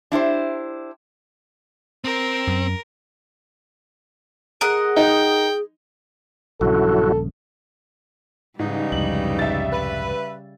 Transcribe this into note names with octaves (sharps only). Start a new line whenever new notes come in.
D4 E4 G4 C5
C4 A#4
F#2
G#4 A#4 D#5 F#5
D#4 G5
A#1 G2 C#3 F#3 E4 F#4 A4
G#2 C#3 E3 G3 D#4
C2 F2 G#2 F#7
E5 A6
B4